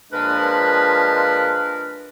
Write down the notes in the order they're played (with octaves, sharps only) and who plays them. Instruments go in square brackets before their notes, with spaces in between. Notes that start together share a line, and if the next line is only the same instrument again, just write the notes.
[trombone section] A#2 F3 G#3 [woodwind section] D4 A#4 B4